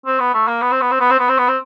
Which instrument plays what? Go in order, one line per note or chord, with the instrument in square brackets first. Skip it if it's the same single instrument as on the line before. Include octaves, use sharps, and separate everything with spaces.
[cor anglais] C4
B3
A3
A#3
B3
C4
B3
C4
B3
C4
B3
C4
B3
C4